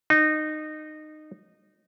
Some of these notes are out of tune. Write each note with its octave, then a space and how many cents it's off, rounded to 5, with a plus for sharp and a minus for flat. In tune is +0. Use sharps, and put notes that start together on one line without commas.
D#4 -20